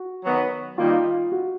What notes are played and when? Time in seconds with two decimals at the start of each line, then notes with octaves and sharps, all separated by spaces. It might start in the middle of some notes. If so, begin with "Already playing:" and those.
Already playing: F#4
0.25 D#3 F#3 B3
0.78 D#3 G3 A#3 D#4 F4
1.32 F#4